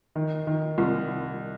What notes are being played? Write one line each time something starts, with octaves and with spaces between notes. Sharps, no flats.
D#3
D#3
C2